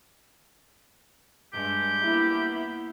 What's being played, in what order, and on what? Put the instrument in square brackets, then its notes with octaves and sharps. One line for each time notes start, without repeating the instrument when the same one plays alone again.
[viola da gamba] G2 G#3 [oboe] G4 [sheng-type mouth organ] G6
[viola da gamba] A#3 B3 [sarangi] E4